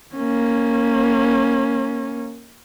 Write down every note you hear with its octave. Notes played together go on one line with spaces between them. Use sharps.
A#3 C#4